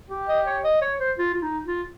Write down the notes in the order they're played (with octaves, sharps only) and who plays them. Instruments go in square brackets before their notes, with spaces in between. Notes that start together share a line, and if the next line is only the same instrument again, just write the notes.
[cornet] G4
[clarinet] D#5
C#5
D#5
C#5
C5
F4
F4
D#4
F4